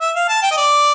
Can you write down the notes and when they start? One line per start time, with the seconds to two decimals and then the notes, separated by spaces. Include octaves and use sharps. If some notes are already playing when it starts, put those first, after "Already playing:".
0.01 E5
0.15 F5
0.29 A5
0.42 G5
0.51 D#5
0.57 D5